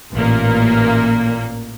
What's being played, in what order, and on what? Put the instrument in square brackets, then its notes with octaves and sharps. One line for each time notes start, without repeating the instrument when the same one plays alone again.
[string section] A1 A#2 A#3